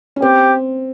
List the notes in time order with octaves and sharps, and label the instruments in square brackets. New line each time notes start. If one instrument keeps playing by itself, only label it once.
[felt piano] C#4
[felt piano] C4 [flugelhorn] G4